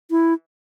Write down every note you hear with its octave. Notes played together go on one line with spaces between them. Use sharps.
E4